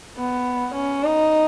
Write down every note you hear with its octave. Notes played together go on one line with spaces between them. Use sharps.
B3
C#4
D#4